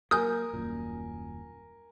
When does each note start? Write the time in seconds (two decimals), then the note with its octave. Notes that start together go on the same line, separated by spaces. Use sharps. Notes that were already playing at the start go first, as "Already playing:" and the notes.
0.11 F#3 A#3 A#4 G#5 D#6 F6 G6
0.53 D#1 F#2 A#2